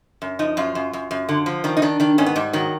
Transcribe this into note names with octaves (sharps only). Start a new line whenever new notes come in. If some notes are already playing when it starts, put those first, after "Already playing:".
F#2
F3 D#4
F#2 F4
F#2
F#2
F#2
D3
F3
D#3 D4
D#4
D#3 D4
D#3 D4
G#2 C#4
B3
G#2 G3
D#3 F#3